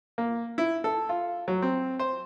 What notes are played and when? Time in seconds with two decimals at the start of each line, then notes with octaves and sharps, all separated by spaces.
0.18 A#3
0.58 E4
0.84 A4
1.09 F4
1.48 F#3
1.62 C4
1.99 C5